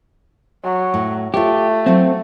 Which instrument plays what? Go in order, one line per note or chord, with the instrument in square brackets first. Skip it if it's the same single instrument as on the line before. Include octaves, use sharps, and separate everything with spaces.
[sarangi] F#3
[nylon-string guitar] A2
[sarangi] A3 [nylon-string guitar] F4 C#5 [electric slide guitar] G4
[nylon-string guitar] F#3 E4 F5 [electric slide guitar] C4